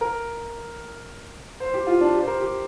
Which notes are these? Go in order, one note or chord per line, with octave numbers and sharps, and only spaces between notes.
A#4
C5
G4
F4
D4
G4
C5
A#4
G4